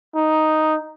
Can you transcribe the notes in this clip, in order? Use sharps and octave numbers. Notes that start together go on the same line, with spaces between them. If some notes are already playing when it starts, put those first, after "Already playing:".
D#4